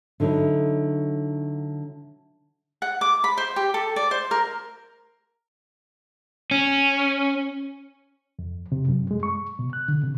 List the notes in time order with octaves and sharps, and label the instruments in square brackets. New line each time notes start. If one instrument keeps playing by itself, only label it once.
[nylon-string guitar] D3 F#3 D#4 E4
[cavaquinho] F#5
D6
B5
C5
G4
A4
D5
C5
A#4
[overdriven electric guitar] C#4
[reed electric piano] F2
C3
F#2
G#3
C#6
B2
F#6
D3
C3